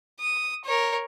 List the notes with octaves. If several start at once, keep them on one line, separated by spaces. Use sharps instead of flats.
D#6
A#4 C#5